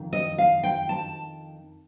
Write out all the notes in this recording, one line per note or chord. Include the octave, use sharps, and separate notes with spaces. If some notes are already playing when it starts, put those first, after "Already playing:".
Already playing: F2 D#3
D#5
F5
G5
A5